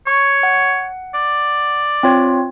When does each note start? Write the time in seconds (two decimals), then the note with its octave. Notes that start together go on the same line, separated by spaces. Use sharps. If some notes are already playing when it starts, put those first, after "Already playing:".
0.07 C#5 C#6
0.43 F#5
1.14 D5
2.03 C4 F4 C#5